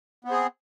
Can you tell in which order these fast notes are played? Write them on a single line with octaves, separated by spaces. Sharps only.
B3 C4 G#4